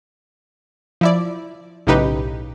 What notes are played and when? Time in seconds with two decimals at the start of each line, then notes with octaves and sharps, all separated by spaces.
1.01 F3 E4 D5
1.87 B1 A2 C#3 D#4 G4 B4